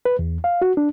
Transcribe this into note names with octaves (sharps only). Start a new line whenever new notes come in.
B4
E2
F5
F#4
D4